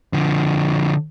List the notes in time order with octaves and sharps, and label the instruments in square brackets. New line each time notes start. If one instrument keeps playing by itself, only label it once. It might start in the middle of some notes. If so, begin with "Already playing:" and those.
[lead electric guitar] D3 F3